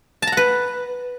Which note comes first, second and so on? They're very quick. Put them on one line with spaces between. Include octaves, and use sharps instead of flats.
A5 A#5 F#5 B4